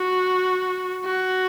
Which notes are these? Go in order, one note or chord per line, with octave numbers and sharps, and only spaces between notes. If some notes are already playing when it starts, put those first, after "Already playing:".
Already playing: F#4
F#4